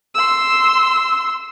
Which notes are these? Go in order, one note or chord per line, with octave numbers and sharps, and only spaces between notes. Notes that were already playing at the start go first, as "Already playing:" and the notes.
C6 E6